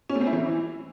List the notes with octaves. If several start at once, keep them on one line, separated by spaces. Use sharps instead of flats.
C#4
A3
C4
E4
E3